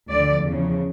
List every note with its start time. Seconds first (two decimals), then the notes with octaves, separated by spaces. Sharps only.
0.11 D2 D3 F3 D5
0.46 E2 C#3 F3